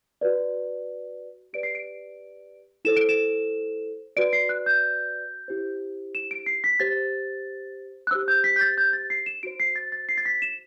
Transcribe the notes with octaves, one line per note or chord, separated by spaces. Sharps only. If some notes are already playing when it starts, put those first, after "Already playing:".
F#4 B4 D5
G4 B4 D5 D7
C7
D7
E4 A4 C5 E7
D7
E7
F#4 B4 D5 D7
C7
F#6
G6
E4 G4 C5
E7
D7
C7
B6
G4 C5 A6
F#6
G4 C5 E6
G6
B6
G6
A6
G6
A6
C7
E7
F#4 C5 D7
C7
A6
A6
C7
A6
B6
E7